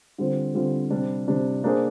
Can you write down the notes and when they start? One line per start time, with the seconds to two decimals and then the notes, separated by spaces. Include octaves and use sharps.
0.18 D3 G3 C4 F4 C5
0.55 D3 G3 C4 F4 C5
0.90 C3 G3 D4
1.28 C3 G3 D4
1.64 A#3 D4 G#4 C5